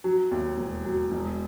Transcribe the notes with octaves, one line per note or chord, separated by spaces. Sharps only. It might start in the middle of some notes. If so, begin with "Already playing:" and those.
F#3
D#2
E1
F#3
E1